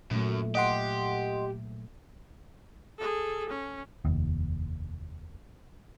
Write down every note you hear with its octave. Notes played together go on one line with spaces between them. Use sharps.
F#2 A#2 F#3 A3
G4 D#5 F#5 C6
G#4 A4
C#4
F1 D#2